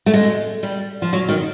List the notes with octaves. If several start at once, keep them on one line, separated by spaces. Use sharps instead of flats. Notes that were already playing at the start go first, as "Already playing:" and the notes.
A3
G#3
G3
F3
F#3
D#3